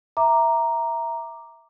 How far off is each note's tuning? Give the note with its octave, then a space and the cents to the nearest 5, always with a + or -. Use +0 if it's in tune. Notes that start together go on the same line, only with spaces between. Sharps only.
E5 +0 A#5 +0 D6 +0